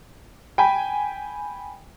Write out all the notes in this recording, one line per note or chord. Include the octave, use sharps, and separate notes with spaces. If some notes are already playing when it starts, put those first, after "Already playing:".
G5 G#5 B5